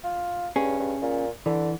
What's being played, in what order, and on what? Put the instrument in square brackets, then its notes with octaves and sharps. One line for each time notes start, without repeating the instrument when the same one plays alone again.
[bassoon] F4
[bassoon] G2 [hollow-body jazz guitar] C#4 G#4
[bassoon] G2
A#2
[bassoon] D3 [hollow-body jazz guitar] E3